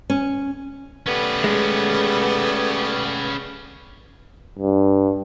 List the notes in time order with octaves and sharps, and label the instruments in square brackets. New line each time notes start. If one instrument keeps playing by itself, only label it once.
[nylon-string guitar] C#4
[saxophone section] G3 A3 B3 [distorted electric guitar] C#4 B4
[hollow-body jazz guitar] G#3
[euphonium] G2